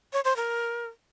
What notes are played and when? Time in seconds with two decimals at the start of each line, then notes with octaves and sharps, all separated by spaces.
0.13 C#5
0.25 C5
0.36 A#4